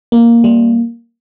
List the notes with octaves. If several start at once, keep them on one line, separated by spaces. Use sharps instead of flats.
A#3
G3